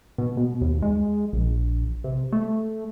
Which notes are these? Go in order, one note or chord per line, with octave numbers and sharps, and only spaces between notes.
B2
B2
D#2
G#3
A#1
C3
A3